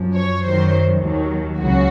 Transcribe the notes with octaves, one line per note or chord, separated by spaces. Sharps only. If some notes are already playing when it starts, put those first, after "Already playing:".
Already playing: F#2 F3
C#5
F#2 D#3 F#3 C5
D#2 D#3 F#3
C#2 C#3 F#3 F#4